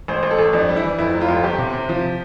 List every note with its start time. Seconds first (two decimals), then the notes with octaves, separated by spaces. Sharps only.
0.08 A1 C5
0.23 A1
0.31 A4
0.39 A1
0.53 F2 D4
0.69 G3
0.76 E4
0.83 E3
0.98 F2 E4
1.14 F1
1.21 F4
1.28 F2
1.43 G1 G4
1.58 C3
1.73 C3
1.89 F3